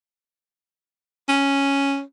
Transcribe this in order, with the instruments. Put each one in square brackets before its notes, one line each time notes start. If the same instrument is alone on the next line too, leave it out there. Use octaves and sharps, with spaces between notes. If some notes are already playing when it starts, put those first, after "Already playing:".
[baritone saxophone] C#4